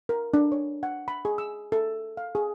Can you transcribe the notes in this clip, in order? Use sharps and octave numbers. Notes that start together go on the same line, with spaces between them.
A#4
D4
C#5
F#5
B5
G#4
E6
A4
F5
G#4